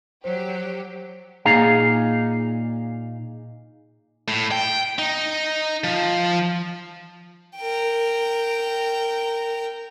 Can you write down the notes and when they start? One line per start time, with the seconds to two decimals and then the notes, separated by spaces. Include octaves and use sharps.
0.24 F#3 G4 C5
1.45 A#2 D#4 G#4 F5 A#5
4.28 A2
4.52 G5
4.99 D#4
5.84 F3
7.57 A#4 G5